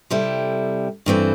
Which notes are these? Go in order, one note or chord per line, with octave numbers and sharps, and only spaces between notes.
C3 G3 E4 A4
G2 E3 C4 A4